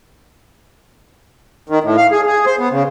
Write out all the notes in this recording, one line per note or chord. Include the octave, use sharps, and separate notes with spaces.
D#3
A2
F5
G#4
G#4
C5
B3
C#3